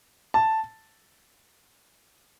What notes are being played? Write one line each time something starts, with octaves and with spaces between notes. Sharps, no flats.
A5